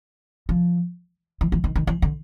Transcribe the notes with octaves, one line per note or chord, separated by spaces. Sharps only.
F3
E3
E3
D#3
D#3
E3
D3